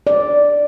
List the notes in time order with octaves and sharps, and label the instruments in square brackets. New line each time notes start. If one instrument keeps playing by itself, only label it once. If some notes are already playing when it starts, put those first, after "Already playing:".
[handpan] D5